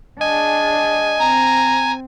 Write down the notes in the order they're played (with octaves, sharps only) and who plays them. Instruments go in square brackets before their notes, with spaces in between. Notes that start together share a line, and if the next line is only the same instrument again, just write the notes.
[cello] D4 G#4 [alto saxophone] D#5 [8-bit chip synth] G#5
[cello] C4 [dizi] A#5